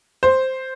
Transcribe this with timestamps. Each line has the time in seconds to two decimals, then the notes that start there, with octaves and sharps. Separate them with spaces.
0.23 C5